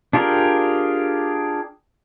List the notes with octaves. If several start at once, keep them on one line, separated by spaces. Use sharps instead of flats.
D4 F4 G4 G#4 A#4